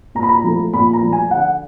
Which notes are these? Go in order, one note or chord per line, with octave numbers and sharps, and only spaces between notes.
A#2 A#5
B5
A#5
F3 A3
A#2 B5
A#5
F3 A3
G#5
D3 F#5